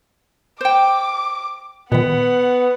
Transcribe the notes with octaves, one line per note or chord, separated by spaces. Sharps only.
C5 G5 D6
A#2 D#3 B3 F#5